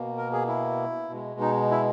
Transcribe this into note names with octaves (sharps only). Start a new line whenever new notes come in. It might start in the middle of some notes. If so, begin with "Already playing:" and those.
Already playing: B2 A#3
A#4
G#4
E4
B2 G#3
D#4
E4